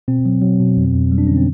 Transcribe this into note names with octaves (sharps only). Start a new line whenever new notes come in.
B2 C4
F#3
F#3
B2
F2
F2
G3
D4
D3 C#4
C4